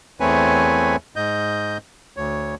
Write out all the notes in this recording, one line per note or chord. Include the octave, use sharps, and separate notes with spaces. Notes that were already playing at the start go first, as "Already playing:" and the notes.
E2 A3 C4 B4 C#5 G#5
G#2 D#5 G6
D2 C#5